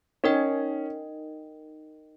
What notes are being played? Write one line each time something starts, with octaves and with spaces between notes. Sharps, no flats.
C#4 D#4 A#4 D#5 G5